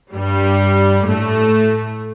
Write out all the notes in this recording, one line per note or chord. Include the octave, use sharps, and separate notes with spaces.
G2 G3
A2 A3